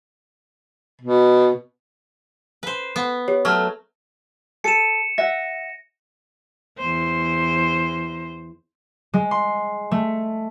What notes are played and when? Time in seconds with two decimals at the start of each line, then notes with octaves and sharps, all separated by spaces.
1.01 B2
2.63 B4 C5
2.96 B3
3.28 G4 C#5
3.45 F#3 A3 C#6 F6
4.64 A4 C#7 D#7 E7
5.18 E5 F#5 A#6
6.79 E2 C5
9.14 G#3
9.31 C6
9.91 A3